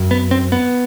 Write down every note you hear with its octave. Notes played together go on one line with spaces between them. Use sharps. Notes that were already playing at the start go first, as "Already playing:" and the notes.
Already playing: F#2
B3
C4
B3